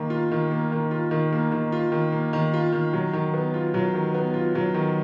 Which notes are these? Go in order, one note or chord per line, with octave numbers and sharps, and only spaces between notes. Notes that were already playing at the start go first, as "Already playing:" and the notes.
Already playing: D#3 A#3
F4
D#3
A#3
D#3
F4
D#3
A#3
D#3
F4
D#3
A#3
D#3
F4
D#3
F#3
D#3
B3
F4
F#3
D#3
B3
F4
F#3
D#3